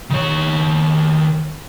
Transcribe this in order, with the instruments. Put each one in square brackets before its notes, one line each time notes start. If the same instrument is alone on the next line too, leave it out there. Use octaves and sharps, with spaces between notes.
[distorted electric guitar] D#3 C#5